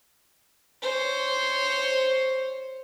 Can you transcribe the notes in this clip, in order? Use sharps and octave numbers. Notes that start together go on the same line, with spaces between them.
C5 C#5